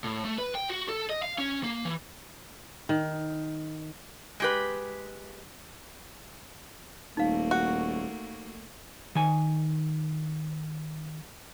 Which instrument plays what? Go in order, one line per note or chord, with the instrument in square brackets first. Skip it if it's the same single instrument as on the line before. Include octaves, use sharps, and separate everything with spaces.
[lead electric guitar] A2
A3
B4
G5
F#4
A4
D#5
F5
C#4
A#3
E3
[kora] D#3
[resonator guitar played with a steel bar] G#3 G4 B4
[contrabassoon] D#1 [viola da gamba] A3 A#3 [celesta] D#4 F5
[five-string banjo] F#4
[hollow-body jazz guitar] D#3 G#5